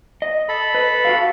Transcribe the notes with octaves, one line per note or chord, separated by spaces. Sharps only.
D#5
A4 B5
B4
F#4 G4 F5